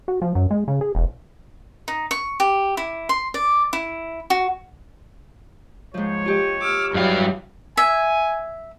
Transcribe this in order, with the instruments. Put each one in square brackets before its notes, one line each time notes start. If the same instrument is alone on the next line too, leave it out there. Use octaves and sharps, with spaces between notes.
[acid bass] F#4
F3
F#2
G#3
C#3
G#4
E1
[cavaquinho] D#4
C#6
G4
E4
C6
D5
E4
F#4
[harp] G#2 F3 [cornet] C#5
[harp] F4 G4 D#5
[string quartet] D6 E6 F6
[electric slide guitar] G2 F5 [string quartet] E3 F#3 G3
[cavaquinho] E5 [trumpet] G#5